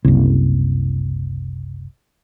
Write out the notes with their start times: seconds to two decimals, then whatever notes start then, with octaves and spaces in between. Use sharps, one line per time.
0.05 F#1 C2